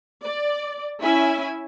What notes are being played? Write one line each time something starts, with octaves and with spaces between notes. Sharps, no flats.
D5
C#4 E4 E5 G#5